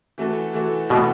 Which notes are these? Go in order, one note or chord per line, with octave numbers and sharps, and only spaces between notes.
E3 A3 F#4 A4
E3 A3 F#4 A4
B2 E3 A3 F#4 A4